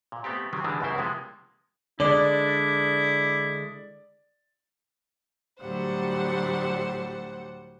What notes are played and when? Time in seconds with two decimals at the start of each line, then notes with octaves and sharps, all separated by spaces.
0.12 A#2
0.24 A3 B3 C4 G4
0.53 C3 D#3 F#3 C4
0.64 D3 E3 G3 G#3 A#3 D4
0.80 C#2 F#2 C#3 C4 E4 C5
0.98 C3 F3 G#3 A#3 B3
2.00 D3 G#3 E4 D5
5.60 D2 A2 F#3 G3 C5 F#5